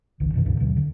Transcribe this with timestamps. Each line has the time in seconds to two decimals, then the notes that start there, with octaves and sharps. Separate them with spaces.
0.20 G#1 C#2 D#3
0.34 F#2 B2 D#3
0.46 C#2 G2 A#2 D3
0.60 D#2 B2 D3 F#3
0.76 D3